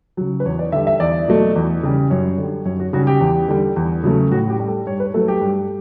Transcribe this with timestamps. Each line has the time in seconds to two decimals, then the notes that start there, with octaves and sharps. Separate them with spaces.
0.17 C#3 F#3
0.40 B4
0.46 E2 C#5
0.59 D5
0.72 D3 G3 E5
0.87 E5
1.00 E2 D5
1.28 B2 F#3 A3
1.56 E2
1.83 C#3 G3
2.10 F#2 C#5
2.38 D3 G3
2.65 F#2 C#5
2.80 F#4
2.93 C#3 G3 F#4
3.07 G4
3.21 E2
3.48 D3 G3
3.76 E2
4.04 C#3 F#3 A3
4.31 A2 F#4
4.50 G4
4.60 G3
4.68 A4
4.86 G2 C#5
5.00 B4
5.14 F#3 A3 A4
5.28 G4
5.41 G2